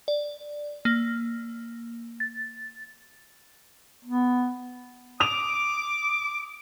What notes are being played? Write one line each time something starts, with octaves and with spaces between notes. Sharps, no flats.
D5
A#3
A6
B3
D6 D#6 F7